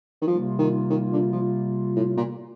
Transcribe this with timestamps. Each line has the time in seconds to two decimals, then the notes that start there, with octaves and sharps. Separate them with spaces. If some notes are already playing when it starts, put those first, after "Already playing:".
0.21 D#3
0.27 C3 F3 G3 A#3 F4
0.59 D#3
0.90 D#3
1.13 D3
1.33 F3
1.96 A2
2.17 A#2